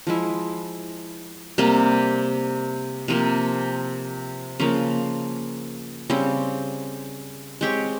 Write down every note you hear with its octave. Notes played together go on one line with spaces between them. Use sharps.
F3 G#3 E4
C3 G3 A#3
C3 F3 A#3
C#3 F3 A#3
C#3 G3 C4
G#3 C4 G4 C#5